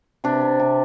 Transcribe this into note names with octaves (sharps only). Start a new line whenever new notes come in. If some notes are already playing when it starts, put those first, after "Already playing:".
C3 D4
C3
C3